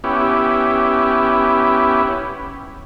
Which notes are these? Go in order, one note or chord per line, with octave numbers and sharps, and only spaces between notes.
B3 C#4 E4 G4